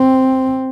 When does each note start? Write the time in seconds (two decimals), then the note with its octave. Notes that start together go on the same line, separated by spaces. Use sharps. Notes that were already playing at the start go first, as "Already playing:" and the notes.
Already playing: C4